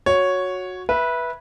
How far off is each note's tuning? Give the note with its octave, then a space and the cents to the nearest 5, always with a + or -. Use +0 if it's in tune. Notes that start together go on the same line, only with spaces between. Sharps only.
F#4 -15 C#5 +0
B4 -15 E5 +0